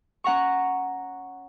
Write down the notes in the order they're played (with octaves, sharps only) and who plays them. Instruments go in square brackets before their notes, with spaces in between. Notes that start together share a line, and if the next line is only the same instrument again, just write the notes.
[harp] C#4 F#5 A#5 C#6